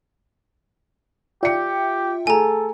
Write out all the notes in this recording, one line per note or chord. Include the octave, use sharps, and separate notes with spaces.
F4 G4 D5 E5 G5 C#7
A3 G#4 A4 G#5 A#5